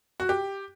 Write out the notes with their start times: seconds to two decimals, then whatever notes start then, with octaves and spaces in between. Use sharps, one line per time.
0.20 F#4
0.29 G4